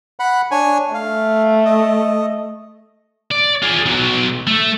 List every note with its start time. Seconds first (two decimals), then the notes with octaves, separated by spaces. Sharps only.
0.20 F#5 B5
0.51 D4 C#5 G#5
0.94 A3 F5
1.65 D#5
3.32 D5
3.63 F4 G#4
3.86 B1 F#3
4.47 A3